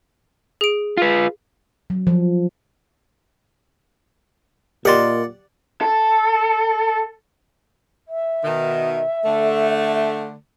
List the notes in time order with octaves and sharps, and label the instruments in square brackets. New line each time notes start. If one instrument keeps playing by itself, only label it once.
[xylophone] G#4 D7
[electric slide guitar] F4 B4
[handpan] F#3
F3
[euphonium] A#2 [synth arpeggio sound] G4 [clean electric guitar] A#4 D#5 C6 [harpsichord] D5 F#5
[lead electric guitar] A4
[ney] E5
[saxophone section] B2 D#3
D3 A3